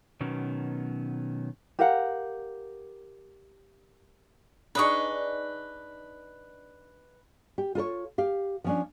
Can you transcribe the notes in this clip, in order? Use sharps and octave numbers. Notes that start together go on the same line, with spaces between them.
B2 D#3 F#3 B3 C#4
G4 A#4 F5 F#5
D4 D#4 G#4 B4 D#5 C#6
G4
F4 A4 A#4 C#5
G4 F5
F3 C#4 D4